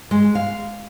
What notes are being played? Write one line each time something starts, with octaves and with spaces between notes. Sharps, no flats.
G#3
F5